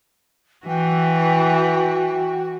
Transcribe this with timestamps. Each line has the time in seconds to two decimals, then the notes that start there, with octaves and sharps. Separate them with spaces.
0.67 E3 F#4 G5